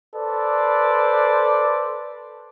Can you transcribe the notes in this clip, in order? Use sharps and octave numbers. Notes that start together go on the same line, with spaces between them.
A4 B4 C5 D5